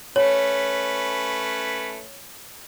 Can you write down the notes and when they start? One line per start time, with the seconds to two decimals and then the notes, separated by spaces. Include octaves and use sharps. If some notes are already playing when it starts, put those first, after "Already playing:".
0.16 A3 C#4 B4 C#5